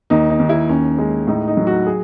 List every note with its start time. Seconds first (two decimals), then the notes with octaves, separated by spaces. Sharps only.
0.10 D#2 D#4
0.30 D#4
0.40 D#2
0.49 E4
0.69 D#2 C#4
0.98 G#3 C#4
1.27 A2 D#4
1.48 D#4
1.57 F#3
1.67 F#4
1.86 G#4